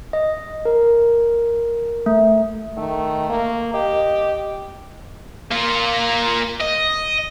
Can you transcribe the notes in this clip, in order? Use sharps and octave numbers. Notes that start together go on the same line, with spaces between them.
D#5
A#4
A3
D#3 A3
A#3
G4 D#5
A#3 F4
D#5